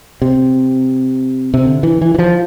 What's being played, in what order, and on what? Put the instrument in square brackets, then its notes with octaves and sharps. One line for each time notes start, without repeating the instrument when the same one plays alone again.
[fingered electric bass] C3
C3
D3
E3
E3
E3
F3